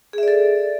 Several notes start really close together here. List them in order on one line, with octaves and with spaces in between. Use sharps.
G#4 E5 D5 A4